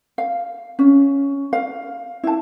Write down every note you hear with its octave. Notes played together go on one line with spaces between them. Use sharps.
F5
C#4
F5
E4 A5